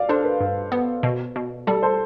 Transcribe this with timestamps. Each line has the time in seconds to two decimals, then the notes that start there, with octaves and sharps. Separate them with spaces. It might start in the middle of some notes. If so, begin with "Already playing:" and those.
Already playing: D5 F5
0.09 D4 A4 C5
0.24 B4
0.40 G2
0.72 B3
1.03 B2
1.36 B2
1.67 G3 A4
1.83 A4 C5